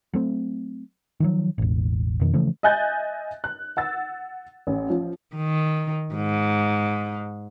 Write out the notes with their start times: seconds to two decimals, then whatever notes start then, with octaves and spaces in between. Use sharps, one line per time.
0.13 F#3 A3 C4
1.20 D#3 F3 F#3
1.58 E1 A1
2.21 F2 B2 D#3
2.33 C#3 E3 F3 A3
2.63 D#5 E5 G#5 F#6 G6 A6
3.44 F#6
3.77 F#5 E6 A6
4.67 A1
4.90 F3
5.36 D#3
6.15 G#2